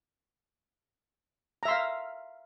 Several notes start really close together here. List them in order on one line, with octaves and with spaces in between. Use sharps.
A#5 E5 C6 F5